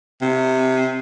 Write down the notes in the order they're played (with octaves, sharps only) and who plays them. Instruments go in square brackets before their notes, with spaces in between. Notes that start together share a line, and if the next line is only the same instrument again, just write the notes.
[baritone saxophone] C3